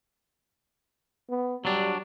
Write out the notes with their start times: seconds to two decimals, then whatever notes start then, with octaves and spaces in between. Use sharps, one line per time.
1.29 B3
1.65 F#3 G3 D4